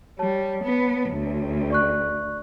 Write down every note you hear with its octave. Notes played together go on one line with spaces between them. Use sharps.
G3 C#5 A5
B3
D2
D5 C#6 F#6